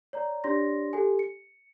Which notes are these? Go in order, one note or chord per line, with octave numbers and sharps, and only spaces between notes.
C#5 D5 A#5
D4 G4 C#5 D5 C6 A#6
G4 A4 G#5
C#7